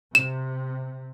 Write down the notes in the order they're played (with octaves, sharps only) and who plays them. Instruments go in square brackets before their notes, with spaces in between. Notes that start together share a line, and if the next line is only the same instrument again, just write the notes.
[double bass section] C3 [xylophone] E7